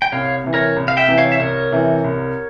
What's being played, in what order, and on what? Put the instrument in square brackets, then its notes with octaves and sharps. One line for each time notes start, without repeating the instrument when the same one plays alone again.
[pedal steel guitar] G5
[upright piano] C2 [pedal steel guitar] C#5 F5
[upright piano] C3 E3
[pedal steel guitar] A#4 C#5
[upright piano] C2
[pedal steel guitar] F5
E5 G5
[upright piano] C3 E3
[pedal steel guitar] C#5 F5
E5
[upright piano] C2 [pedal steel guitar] A#4 C#5
[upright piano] C3 E3
C2